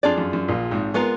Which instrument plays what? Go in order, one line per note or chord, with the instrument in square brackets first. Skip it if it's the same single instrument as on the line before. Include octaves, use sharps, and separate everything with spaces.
[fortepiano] F2 [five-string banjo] D4 F4 G#4 D5
[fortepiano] F#2
F#2
A#1 A#2
G#1 G#2
[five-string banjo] G#3 B3 F4 A#4